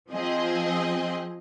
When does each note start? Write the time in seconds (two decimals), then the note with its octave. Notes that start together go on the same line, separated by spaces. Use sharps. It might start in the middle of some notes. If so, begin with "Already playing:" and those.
0.10 F3 C4 G#4 D#5